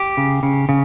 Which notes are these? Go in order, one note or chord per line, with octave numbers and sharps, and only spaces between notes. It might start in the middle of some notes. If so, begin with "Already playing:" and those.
Already playing: G4
C#3
C#3
C#3